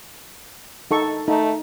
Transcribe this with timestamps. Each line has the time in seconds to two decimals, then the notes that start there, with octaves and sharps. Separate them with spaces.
0.91 D#4 A4 C#6
1.28 A3 D#4